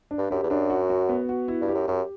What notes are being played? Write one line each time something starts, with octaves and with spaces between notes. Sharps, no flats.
D4
G2
F#2 G4
E2
F#2 D4
F#4
F#4
B3
F#4
E4
G2
G4
F#2
F#2 G4